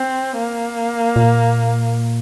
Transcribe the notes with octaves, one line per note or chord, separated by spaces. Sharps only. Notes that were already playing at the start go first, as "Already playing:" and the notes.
Already playing: C4
A#3
A#2